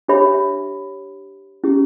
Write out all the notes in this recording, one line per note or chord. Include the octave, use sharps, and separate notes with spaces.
D4 G4 C#5 E5 B5
C#4 E4 G4